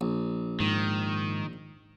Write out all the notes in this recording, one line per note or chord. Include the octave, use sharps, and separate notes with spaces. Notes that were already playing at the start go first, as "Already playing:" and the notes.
A#1
G#2 D#3